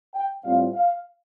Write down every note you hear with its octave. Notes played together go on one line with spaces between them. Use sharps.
G5
A2 G3 C4 F4 F5
F5